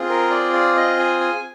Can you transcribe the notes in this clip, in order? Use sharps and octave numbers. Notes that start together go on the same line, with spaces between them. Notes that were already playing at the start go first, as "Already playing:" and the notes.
Already playing: C4 F4 G#4
A#4
D5
D5
D#5
G#5
G#5